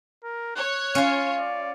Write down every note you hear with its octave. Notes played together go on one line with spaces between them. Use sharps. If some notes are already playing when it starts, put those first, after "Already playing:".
A#4
C#5 F#6
C#4 F4 F5
D5